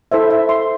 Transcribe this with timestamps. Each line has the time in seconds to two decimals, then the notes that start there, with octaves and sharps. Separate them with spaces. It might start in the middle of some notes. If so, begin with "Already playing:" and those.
0.12 E4 A4 C5 E5
0.30 E5
0.49 C6